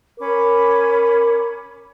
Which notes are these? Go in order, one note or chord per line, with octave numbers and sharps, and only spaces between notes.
C#4 A#4 B5 D6